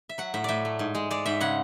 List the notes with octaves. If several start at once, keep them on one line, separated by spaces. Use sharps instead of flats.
E5
F#3 F#5
A2 E5
A2 D5 E5
A3
G#2
G#3
G#3 D5
G#2 E5
C#3 F#5